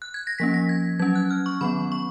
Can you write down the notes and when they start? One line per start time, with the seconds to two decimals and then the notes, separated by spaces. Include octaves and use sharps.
0.02 F#6
0.14 G#6
0.27 A#6
0.39 F3 A#3 C#4 B6
0.54 A#6
0.69 G#6
0.99 F#3 C#4 G#6
1.15 F#6
1.31 F6
1.46 C#6
1.61 D#3 F#3 B3 B5
1.92 C#6